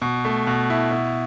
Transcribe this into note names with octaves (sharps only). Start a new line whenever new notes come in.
B2
A3
B2
E4
B2